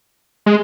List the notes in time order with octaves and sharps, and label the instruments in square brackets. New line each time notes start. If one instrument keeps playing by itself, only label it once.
[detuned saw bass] G#3